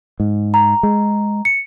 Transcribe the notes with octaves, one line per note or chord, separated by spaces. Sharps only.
G#2
A#5
G#3
C#7